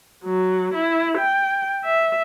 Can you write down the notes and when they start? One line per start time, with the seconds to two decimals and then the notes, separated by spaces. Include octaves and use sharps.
0.24 F#3
0.74 E4
1.18 G5
1.85 E5